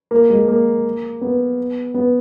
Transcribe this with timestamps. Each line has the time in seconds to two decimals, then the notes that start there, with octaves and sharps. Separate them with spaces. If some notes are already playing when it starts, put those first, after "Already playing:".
0.11 A#3
0.30 G#3
0.48 A#3
1.21 B3
1.94 B3